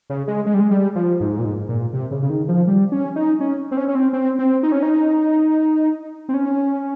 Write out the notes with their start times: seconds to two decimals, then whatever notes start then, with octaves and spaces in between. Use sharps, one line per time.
0.10 C#3
0.28 G#3
0.46 G#3
0.54 G3
0.60 G#3
0.71 G3
0.95 F3
1.20 G#2
1.39 A#2
1.45 G#2
1.69 A#2
1.93 C3
2.11 C#3
2.22 C#3
2.30 D#3
2.48 F3
2.67 G3
2.92 C#4
3.16 D#4
3.40 C#4
3.71 C4
3.77 C#4
3.88 C#4
3.95 C4
4.13 C4
4.39 C4
4.63 D#4
4.72 C#4
4.83 D#4
6.29 C4
6.34 C#4